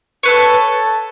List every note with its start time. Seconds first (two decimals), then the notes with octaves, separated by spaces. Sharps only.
0.23 A4 B4 C#5